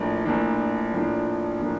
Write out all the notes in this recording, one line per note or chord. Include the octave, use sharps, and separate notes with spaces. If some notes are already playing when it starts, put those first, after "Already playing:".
Already playing: A#1 A2 F3 A#3 D4
A#1 A2 F3 A#3 D4
A#1 A2 F3 A#3 D4
A2 F3 A#3 D4